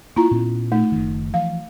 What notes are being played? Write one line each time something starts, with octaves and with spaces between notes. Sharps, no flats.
A#3 E4 F4 A#5
A#2 B3 C#4
A3 D#4
F#1 D#3
E3 F3 F5